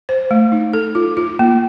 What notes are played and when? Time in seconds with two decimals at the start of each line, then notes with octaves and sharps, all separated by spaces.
0.09 C5
0.31 A3
0.52 D#4
0.73 A4
0.95 F4
1.17 F4
1.39 A#3